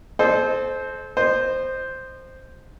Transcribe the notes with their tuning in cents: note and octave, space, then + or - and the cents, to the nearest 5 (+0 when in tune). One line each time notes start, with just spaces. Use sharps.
A4 -30 C5 +0 D#5 -45
C5 +0 D#5 -30